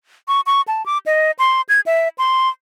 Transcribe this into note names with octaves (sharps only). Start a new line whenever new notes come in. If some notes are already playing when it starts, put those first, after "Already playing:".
C#6
C#6
A5
D6
D#5
C6
G#6
E5
C6